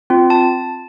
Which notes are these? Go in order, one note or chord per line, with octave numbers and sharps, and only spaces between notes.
C4 F4
A5